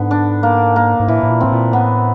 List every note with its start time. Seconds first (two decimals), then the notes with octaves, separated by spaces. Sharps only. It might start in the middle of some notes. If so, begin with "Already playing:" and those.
Already playing: G#2 D3 B3
0.11 D4
0.43 A#3
0.76 A#3
1.00 G#2
1.08 A2 E3
1.23 A2
1.29 A#2
1.41 A2 C4
1.52 A#2
1.73 A2 B3